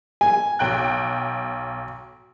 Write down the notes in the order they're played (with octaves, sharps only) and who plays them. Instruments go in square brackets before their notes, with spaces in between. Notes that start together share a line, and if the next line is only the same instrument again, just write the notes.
[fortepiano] G#5
[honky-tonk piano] B1 G5 F#6